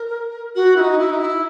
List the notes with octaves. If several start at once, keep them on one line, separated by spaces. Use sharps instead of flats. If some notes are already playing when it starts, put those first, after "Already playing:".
Already playing: A#4
F#4
E4
D#4
E4
D#4
E4